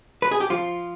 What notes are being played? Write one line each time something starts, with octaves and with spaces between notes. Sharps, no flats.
B4
G#4
G4
F3 F4